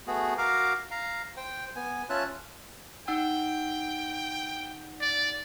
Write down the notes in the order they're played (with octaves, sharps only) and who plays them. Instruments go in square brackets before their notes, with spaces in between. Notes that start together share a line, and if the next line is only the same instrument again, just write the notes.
[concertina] A3 B3 F#4 G#4
F#4 A#4 F5 A#5 D6
F5 A#5
C5 G5
B3 G#5
C#4 F4 C#5 E5 A5 F#6
[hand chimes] D#4 F#5 E6 [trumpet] G5
[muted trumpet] D5